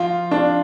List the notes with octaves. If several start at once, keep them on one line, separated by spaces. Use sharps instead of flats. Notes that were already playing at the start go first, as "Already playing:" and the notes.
Already playing: F3 F4
D4